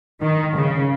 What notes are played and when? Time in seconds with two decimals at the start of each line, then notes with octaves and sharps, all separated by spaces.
0.21 D#3
0.55 C#3